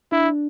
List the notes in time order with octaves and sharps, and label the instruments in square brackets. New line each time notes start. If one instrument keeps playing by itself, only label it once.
[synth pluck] D4 [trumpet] E4